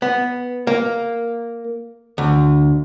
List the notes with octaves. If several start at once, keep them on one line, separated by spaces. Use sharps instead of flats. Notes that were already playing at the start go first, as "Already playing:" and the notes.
B3
A#3
D2